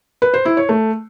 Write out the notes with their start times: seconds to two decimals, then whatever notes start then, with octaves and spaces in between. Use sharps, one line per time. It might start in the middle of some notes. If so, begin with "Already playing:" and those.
0.22 B4
0.34 C5
0.45 E4
0.57 C#5
0.69 A3